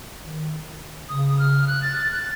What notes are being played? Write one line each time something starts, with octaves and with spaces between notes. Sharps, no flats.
D#3
C#3 D#6
D#6
F6
F#6
A6
A6
F#6
A6